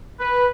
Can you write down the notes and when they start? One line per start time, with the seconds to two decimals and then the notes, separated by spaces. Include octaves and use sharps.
0.20 B4